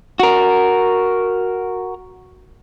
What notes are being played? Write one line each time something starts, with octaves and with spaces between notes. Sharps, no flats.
F#4 A#4